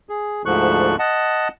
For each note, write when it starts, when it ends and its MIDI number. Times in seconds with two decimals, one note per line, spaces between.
0.09 0.42 68
0.46 0.96 38
0.46 0.96 44
0.46 0.96 50
0.46 0.96 53
0.46 0.96 85
0.46 0.96 90
0.99 1.48 75
0.99 1.48 78
0.99 1.48 81